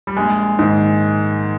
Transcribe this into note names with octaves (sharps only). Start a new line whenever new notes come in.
G3
A#1 G#3
G#2 D#3